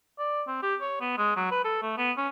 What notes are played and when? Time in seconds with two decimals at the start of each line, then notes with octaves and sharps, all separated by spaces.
0.19 D5
0.47 C4
0.62 G4
0.81 C#5
1.00 B3
1.18 G#3
1.36 F#3
1.51 B4
1.65 A4
1.82 A3
1.97 B3
2.17 C#4